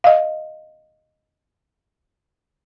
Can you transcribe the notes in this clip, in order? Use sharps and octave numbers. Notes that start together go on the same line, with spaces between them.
D#5 F5